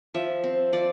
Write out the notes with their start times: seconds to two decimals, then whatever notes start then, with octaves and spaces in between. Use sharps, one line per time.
0.14 F3 E5
0.44 C4
0.73 F3 D5